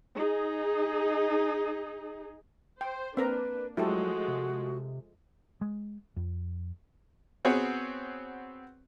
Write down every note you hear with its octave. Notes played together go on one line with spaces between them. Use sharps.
D#4 G#4
C5 G5
A#3 C4 D4 A#4 B4 A#5
F3 F#3 G#3 A3 E4 F#4 G4 A4
C3
G#3
F2
B3 C4 F#4 G#4 C#5